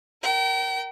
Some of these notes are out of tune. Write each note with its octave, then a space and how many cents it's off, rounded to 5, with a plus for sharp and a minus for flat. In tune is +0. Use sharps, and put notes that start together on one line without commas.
A#4 +0 G5 -35